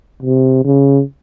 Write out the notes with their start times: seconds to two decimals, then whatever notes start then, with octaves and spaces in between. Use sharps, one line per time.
0.23 C3
0.64 C#3